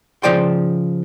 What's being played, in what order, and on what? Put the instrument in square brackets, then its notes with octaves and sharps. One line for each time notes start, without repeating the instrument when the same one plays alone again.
[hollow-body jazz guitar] C#3 F3 C5 D5 G5 C6